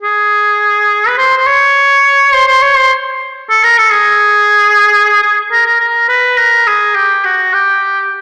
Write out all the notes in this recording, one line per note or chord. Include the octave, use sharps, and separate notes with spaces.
G#4
B4
C5
C5
C#5
C5
C5
C#5
C5
A4
A#4
A4
G#4
G#4
A#4
A#4
A#4
B4
A#4
G#4
G4
F#4
G4